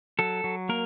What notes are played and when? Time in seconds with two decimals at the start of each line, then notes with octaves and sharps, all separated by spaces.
0.19 F#3 A4
0.44 F#3
0.69 A#3 A#4